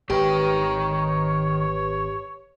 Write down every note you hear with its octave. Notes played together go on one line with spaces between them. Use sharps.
G#1 D#3 G4 B4 C#5 G5